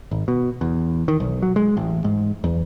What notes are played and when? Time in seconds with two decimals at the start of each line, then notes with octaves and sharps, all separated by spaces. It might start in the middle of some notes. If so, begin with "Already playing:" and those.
0.11 G#1
0.28 B2
0.61 E2
1.08 D#3
1.20 B1
1.43 F#3
1.56 G#3
1.77 A1
2.04 G#2
2.44 E2